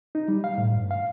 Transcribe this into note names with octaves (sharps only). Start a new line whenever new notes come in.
D#4
G3
F5
A2
G2
F5